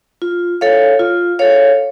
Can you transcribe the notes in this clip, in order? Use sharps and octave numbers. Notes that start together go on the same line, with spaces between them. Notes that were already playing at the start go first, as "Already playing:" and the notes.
F4
A4 C#5 F5
F4
A4 C#5 F5